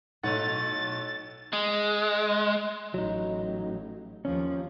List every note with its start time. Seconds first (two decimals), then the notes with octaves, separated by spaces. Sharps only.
0.24 B1 A2 D#4 A4 C#5 F#5 A6
1.53 G#3
2.94 A1 F#3 D#4
4.25 D#2 F3 C#4